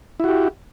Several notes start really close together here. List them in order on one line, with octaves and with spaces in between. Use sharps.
E4 F#4 G4